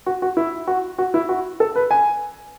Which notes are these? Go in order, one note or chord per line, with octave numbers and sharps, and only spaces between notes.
F#4
F#4
E4
F#4
F#4
E4
F#4
A4
B4
G#5